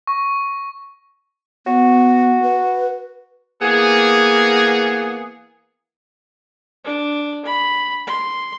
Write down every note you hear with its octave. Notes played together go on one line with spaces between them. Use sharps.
C#6
B3 F#4
B4
E3 A#3 B3 G#4
D4
B5
C6